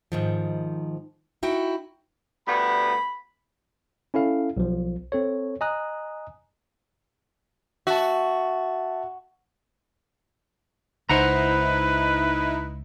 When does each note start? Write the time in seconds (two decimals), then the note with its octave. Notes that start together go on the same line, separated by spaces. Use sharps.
0.12 G#2 D#3 F3
1.43 D#4 E4 F#4 G5
2.47 D2 G3 B3 B5
4.14 C#4 E4 A4 F5
4.57 B1 F3
5.12 C4 A4 C#5
5.61 D#5 G#5 A#5 D#6 F#6
7.87 F#4 E5 A5
11.09 C#2 D#4 E4 B4 C5 F#5 A#5